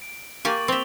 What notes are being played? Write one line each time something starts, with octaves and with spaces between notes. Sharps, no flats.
D7
A#3 G4 G#5 C#6 A6 F#7
C4 E5 D6 F7 G7